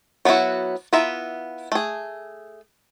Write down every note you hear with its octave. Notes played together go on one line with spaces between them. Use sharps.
F#3 B3 D#4 E4 F#4
B3 E4 F4 E5 A#5
A3 G#4